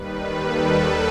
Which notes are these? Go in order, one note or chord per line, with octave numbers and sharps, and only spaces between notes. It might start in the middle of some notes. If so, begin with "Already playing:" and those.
Already playing: D#2 D#3 G3 B4
A4